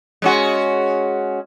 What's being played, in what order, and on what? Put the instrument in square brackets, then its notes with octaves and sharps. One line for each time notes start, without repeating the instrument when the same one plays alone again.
[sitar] G#3 C#4 F#4